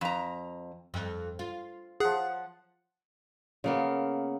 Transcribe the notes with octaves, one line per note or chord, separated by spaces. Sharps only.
F2 A#5
F2
F4
F3 G#4 F#5
C#3 A#3 B3